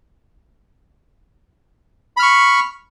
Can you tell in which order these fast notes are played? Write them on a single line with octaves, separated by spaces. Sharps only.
B5 F6 C#6